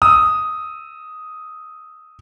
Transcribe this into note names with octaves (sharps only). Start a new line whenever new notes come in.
D#6 E6